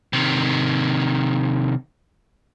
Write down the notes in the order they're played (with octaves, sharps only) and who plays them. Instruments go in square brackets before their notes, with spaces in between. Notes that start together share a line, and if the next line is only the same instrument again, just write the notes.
[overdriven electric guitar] C3 D#3